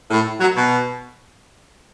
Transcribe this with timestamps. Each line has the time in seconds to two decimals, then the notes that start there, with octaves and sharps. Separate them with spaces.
0.11 A2
0.41 F#3
0.55 B2